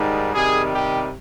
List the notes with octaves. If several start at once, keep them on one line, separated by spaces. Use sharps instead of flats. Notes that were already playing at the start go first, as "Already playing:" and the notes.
Already playing: G#2 D#3 G3
C3 D#3 G3 G#4
G4